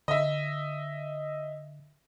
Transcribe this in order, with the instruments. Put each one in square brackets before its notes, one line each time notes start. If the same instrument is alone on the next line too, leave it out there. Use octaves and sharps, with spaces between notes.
[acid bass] D3 [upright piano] D#5 E5